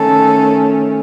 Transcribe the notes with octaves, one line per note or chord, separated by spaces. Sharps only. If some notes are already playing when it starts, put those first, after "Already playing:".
Already playing: D#3 A3 C#4 A4